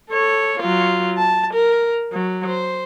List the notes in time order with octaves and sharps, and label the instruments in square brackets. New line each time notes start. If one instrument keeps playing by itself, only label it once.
[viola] A4 C#5
F#3 F4
A5
A#4
F#3
C5